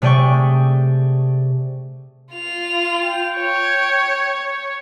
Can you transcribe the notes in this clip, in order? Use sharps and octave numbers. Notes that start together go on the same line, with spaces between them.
C3 A3 G#4 D5 G5 C#6
F4 F7
G5
C#5